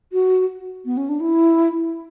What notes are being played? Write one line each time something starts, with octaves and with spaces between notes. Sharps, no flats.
F#4
B3
C#4
D4
E4